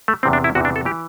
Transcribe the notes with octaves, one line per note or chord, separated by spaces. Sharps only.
A3
E2 C3 E3 C4
D4
E4
E2 C3 E3 F#4
D4
A4
E3 G4